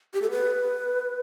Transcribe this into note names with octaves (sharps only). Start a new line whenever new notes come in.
G4
A4
B4